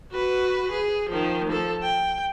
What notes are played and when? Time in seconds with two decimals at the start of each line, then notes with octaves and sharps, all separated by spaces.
0.12 F#4 B4
0.71 G#4
1.09 D#3 F3
1.48 F3 A4
1.83 G5